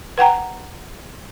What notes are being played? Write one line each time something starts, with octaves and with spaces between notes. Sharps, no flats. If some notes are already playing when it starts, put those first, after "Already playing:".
B4 F#5 G5 A#5